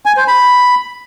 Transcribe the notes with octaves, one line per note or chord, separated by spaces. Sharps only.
G#5
C5
B5